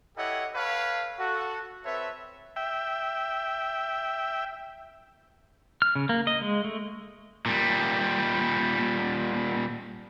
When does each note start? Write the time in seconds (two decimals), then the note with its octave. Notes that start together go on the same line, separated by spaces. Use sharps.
0.17 E4 G4 A4 C#5 D#5 F#5
0.55 A4 B4 C#5 F5
1.19 F#4 A4 F#5
1.85 C4 A4 B4 C#5 E5
2.56 E5 G5
5.82 F6
5.96 C#3
6.09 A#3
6.27 D#5
6.41 G#3
6.65 A3
7.46 A#2 G3